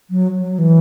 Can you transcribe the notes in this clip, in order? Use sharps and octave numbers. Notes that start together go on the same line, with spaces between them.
F#3
F#3
E3